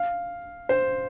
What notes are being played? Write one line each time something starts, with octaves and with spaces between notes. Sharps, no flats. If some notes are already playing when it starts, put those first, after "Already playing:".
Already playing: F5
C5